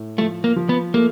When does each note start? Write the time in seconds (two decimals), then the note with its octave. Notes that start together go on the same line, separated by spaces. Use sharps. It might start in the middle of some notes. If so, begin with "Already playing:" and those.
Already playing: A2
0.18 F3 A3
0.44 A#3
0.56 F3
0.69 B3
0.94 A3 A#3